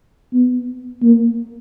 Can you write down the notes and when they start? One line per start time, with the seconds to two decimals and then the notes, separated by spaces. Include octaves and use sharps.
0.33 B3
1.03 A#3